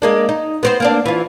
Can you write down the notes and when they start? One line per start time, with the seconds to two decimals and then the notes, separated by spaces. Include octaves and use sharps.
0.02 G#3 A#3 D4
0.29 D#4
0.63 B3 C4 C5
0.80 A#3 C4 D4
1.06 E3 F4